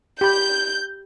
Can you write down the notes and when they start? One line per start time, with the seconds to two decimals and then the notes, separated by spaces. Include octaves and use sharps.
0.21 G4 B5 G6